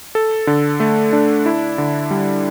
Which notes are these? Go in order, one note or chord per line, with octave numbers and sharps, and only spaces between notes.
A4
D3
A3
D4
E4
D3
G3